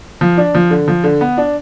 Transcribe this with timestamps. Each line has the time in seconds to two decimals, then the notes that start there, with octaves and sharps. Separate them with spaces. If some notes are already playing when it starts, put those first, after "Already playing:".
0.21 F3
0.38 D4
0.55 F3
0.70 D3
0.88 F3
1.04 D3
1.21 B3
1.37 D4